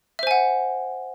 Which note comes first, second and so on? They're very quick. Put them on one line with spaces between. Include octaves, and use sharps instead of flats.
E5 C5 G#5 F#5